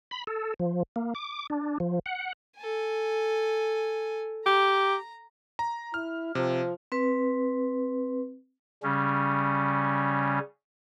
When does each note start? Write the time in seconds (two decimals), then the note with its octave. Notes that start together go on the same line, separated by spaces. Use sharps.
0.11 B5
0.27 A4
0.60 F3
0.96 A#3
1.15 D6
1.50 D4
1.80 F3
2.06 F#5
2.58 A4 G#5
4.46 G4 A#5
5.59 A#5
5.94 E4 F6
6.35 C3 F3
6.92 C4 B4
8.83 C#3 G3 C#4